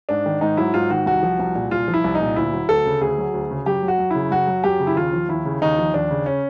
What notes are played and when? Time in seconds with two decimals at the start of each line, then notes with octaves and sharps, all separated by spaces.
0.09 G#2 D4
0.26 D#3
0.41 G#2 D#4
0.57 F#3 E4
0.74 G#2 F4
0.90 D#3 F#4
1.06 C2 F#4
1.23 F3
1.39 C2
1.55 A#2
1.71 C2 F4
1.88 F3
1.94 E4
2.04 C2
2.15 D#4
2.21 A#2
2.36 D2 E4
2.53 F#3
2.69 D2 A4
2.85 C#3
3.01 D2 G#4
3.18 F#3
3.34 D2
3.51 C#3
3.66 F#2 G4
3.82 F#3
3.88 F#4
3.99 F#2
4.10 C#3 E4
4.31 F#2 F#4
4.47 F#3
4.64 F#2 G4
4.80 C#3
4.87 E4
4.96 D#2 F4
5.13 F3
5.29 D#2 E4
5.45 C#3
5.62 D#2 D#4
5.78 F3
5.94 D#2 D4
6.11 C#3
6.26 C#4